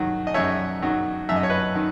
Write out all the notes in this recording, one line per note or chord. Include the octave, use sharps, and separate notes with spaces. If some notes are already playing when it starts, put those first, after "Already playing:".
Already playing: D#3 F#3
D#5
F#2 C#5 E5
D#3 F#3
F#2 E5
D#5
C#5
B4 D#5
D#3